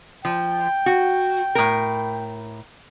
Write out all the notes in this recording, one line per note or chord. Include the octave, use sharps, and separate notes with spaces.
F3 G5
F#4
A2 A#4